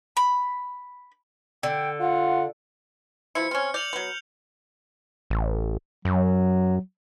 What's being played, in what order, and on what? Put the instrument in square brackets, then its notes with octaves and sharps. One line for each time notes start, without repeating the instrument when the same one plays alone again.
[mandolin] B5
[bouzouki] D3 [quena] G5
[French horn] F4 [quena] F#5
[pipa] B2 F3 E4 [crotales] C#7
[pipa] C4 C#4 [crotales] F6
[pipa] D5 [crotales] G6 F7 F#7
[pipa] F#3 B3
[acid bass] A1
[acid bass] F#2 [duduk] F#3